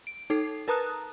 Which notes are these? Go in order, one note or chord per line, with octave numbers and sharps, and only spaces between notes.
D7
D#4 A4 C7
A#4 B4 A5 A#5 D#6 F#6